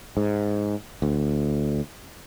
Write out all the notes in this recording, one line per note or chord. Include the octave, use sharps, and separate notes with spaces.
G#2
D2